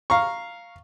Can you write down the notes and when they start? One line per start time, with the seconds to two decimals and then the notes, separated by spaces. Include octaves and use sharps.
0.10 F5 A#5 C#6